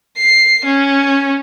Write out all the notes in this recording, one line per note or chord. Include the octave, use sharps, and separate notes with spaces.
C7
C#4